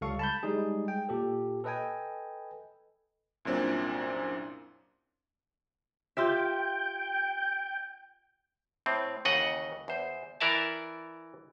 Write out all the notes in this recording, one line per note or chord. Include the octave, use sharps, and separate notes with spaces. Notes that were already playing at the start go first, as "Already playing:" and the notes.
C#2 G3 A4 F5 C#6
A5 B5 G6
G3 G#3 D#4 G#4
G5
A#2 G4 A4
A4 B4 D#5 G5 G#5
C2 F#2 A#2 C4 D4
F4 G4 E5 G5
A2 C4
D#2 C#3 E3 D#5 F#5
E2 C5
E3 A#4 D5 E5 A5